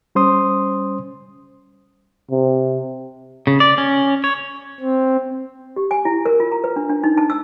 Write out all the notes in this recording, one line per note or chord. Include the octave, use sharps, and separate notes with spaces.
G3 C#4 C5 C6 D#6
C3
C#3
D5
C#4
C#5
C4
G4
G#5
E4
A#4
F4
A#5
B4
D4
D4
D#4
A5
E6